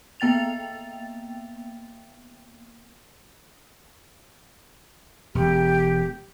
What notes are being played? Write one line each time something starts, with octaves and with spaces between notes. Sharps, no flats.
A#3 B3 G5 A6 F7
E1 G4